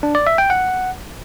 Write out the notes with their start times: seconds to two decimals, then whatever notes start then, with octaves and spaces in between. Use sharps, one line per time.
0.03 D4
0.15 D5
0.27 E5
0.38 G5
0.50 F#5